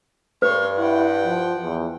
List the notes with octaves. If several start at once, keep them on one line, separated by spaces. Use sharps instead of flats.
G2 B4 C#5 C6
E4 F#5 G5
F3
E2